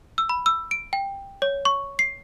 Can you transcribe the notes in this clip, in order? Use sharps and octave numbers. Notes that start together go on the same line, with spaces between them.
E6
B5
E6
D7
G5
C#5
C#6
C7